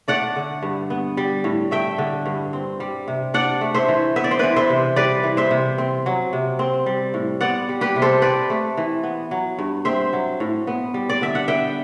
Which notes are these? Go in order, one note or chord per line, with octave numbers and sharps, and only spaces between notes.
A3 D5 F#5
D3
G2
B3
G3
A2
A3 E5 G5
D3
G2
C4
G3
C3
D4 D5 F#5
A3
C5 E5
E3
B3 E5
D5
C5
E3 B4 D5
C5 E5
C3
G3 B4 D5
E3
C5 E5
C3
C4
F#3
C3
C4
G3
A2
B3 D5 F#5
G3
G4 B4
C3
A4 C5
C4 B4 D5
A3
E3
B3
F#3
G2
C4 C5 E5
F#3
A2
B3
G3
D5
D3 E5
F#5
B3 E5 G5